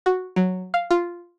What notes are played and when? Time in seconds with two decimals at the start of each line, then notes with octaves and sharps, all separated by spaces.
0.06 F#4
0.36 F#3
0.74 F5
0.91 F4